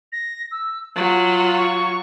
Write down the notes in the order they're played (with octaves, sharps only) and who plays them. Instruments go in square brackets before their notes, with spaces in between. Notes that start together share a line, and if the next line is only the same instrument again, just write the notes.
[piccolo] A#6
E6
[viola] F#3 F4 [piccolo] F#7
[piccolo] C#6